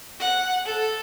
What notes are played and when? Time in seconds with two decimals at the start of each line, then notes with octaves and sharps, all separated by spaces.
0.20 F#5
0.66 A4